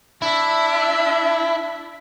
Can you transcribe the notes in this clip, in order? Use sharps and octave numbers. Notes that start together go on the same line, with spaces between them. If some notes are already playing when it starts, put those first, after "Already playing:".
D4 E4 E5